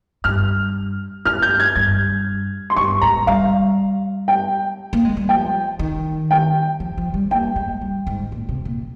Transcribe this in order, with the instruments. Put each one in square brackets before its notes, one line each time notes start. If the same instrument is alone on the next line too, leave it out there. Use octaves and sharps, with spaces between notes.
[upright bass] G2 [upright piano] F6
[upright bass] G2 [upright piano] F6
[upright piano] G6
G#6
[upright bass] G2 [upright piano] G#6
[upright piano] C6
[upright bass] G2 [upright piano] C#6
[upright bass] G#2 [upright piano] A#5
[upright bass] G3 [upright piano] F5
[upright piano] G5
[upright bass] A#3
G#3
G3
[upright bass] F3 [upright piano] G5
[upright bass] D#3
[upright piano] G5
[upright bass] F3
F3
G3
[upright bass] A#3 [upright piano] G5
[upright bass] G#3
G3
G#2
A#2
C3
A#2